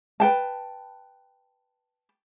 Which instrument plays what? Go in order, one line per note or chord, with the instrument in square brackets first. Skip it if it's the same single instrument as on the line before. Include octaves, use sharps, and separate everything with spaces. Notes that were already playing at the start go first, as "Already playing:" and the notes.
[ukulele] B4 G5 A5